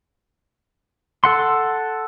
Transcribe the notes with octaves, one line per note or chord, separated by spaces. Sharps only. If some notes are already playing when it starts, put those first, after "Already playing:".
A4 F#5 C6